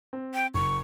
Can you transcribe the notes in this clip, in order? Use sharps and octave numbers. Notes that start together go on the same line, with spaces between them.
C4
G5
F#1 C#6